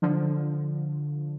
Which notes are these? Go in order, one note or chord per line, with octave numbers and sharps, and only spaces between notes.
D3 F3